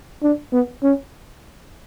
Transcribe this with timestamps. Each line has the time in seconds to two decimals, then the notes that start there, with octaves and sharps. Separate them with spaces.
0.23 D4
0.53 B3
0.83 C#4